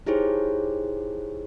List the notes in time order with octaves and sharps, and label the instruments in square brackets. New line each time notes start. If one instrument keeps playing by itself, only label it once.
[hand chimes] D#4 E4 G4 G#4 C5 C#5